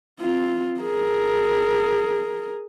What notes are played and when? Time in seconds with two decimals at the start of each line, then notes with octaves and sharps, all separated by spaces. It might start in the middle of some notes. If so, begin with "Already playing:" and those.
0.20 C4 F4
0.80 G#4 A#4